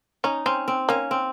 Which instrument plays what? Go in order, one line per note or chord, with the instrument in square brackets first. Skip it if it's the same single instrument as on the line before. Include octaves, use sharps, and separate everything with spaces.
[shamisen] C#4 [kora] D#4
[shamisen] C4 [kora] C#4
[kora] C4
[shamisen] A#3 [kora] C#4
[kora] C4